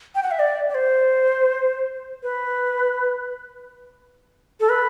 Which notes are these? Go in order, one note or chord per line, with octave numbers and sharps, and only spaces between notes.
G5
F#5
E5
D5
D5
C5
B4
A4
B4